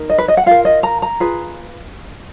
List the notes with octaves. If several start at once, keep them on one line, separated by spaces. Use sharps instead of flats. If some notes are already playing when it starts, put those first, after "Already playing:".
Already playing: D#4 A#4
D#5
B4
D#5
F#5
F4 A#4 F5
D#5
A#5
A#5
F4 G#4 B4